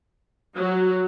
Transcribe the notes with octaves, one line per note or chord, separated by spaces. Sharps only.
F#3